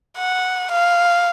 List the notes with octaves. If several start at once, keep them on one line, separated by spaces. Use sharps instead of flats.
F#5
F5